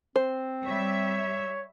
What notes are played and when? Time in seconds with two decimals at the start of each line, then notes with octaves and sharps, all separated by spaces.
0.16 C4 C5
0.67 G3 C#5 E5